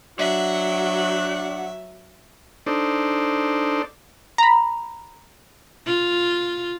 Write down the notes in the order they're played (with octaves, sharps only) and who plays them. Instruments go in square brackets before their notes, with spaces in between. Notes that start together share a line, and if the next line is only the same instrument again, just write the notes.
[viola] F#3 [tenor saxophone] D4 [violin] E5 [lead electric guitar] F#5
[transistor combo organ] D4 D#4 A4 C5 D5
[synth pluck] A#5 B5
[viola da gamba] F4